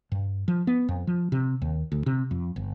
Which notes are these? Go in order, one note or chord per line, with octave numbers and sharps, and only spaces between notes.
G2
F3
B3
F2
F3
C3
D#2
D2
C3
F2
G1